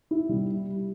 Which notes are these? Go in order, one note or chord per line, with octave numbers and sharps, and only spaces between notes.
E4
G3